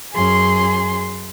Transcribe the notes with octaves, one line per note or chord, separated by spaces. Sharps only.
F#2 G#4 C6